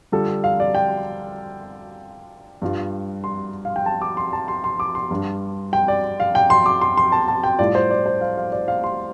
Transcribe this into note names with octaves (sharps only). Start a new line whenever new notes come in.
D3 G3 F4 A4
F5
D5
G5
G2 G3 F4
C6
F5
G5
A5
D6
C6
A5
C6
C6
D6
C6
G2 G3 D4
G5
D5
F5
G5
C6
D6
C6
C6
A5
A5
G5
A2 G3 F4 D5
C5
D5
C5
F5
F5
D5
F5
C6